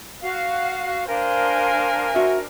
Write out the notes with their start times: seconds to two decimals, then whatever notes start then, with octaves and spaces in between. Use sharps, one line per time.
0.22 F#4 F5
1.08 D4 A#4 C5 F5 G#5
2.15 F#4 E5